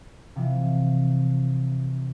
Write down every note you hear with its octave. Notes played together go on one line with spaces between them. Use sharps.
C3 E3 F3 G3